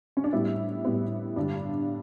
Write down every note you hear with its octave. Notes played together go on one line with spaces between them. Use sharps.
C#4
D4
A2 G3 B3 E4
A2 G3 B3
G2 D3 G3 D4